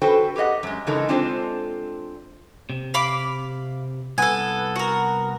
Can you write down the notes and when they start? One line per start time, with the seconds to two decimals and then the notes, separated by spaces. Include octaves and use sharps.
0.02 F#4 A4 B4 C5 G5
0.36 G4 G#4 B4 D#5 F#5
0.63 F#2 G#3
0.87 C#3 E3 G#3 D#4 A4 A#4
1.09 G#3 C4 D4 F4 A4 C5
2.70 C3
2.94 F5 B5 D6
4.18 C2 B3 A4 B4 G#5
4.76 F#4 A#4